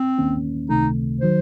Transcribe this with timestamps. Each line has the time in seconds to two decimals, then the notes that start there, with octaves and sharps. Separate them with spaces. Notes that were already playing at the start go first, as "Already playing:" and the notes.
Already playing: C4
0.18 D#2 D#3 A#3 C#4
0.69 C#2 C3 D#3 A3 D#4
1.21 D#3 F#3 C5